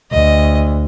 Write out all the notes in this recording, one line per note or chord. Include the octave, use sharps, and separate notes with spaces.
D2 D#5